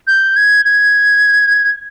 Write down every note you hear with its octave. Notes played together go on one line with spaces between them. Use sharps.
G6
G#6
G#6